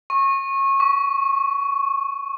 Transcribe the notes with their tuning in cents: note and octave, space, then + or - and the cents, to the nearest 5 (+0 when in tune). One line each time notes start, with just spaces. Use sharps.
C#6 -25
C#6 +15